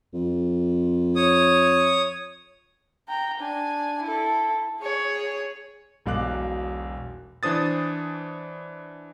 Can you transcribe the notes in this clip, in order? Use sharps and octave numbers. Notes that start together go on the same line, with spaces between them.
F2
C#5 D#6
G5 A#5
D4 G#5
E4 A4
G#4 C#5
E1 B1 F5 D6 F#6
E3 D4 C5 D#6 A6